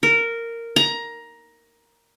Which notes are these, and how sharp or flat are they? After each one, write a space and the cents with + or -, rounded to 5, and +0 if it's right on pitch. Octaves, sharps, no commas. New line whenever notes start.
A#4 -10
A#5 +15